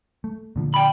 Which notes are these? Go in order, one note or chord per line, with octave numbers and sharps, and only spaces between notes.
A3
A#2 D3 F3
G5 B5